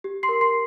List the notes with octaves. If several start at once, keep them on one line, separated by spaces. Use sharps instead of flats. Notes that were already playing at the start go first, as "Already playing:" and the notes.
G4
C6 C7
A#4
C6 C7